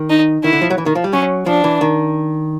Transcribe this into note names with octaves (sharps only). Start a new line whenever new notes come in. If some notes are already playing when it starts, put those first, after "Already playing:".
Already playing: D#3
D#4
D#3 E4
D3
F3
F#3
E3
D#3
F3
G3
F#3 C#4
F3 D4
E3
D#3